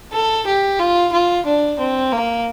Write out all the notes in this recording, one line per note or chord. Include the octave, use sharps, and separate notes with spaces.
A4
G4
F4
F4
D4
C4
A#3